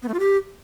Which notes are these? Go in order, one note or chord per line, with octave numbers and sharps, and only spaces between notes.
B3
A3
F4
G4